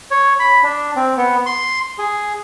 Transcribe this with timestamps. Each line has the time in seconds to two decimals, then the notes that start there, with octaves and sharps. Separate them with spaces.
0.11 C#5
0.40 B5
0.63 D4
0.96 C4
1.17 B3
1.46 C6
1.99 G#4